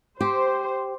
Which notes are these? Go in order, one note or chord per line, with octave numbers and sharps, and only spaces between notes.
G4 C5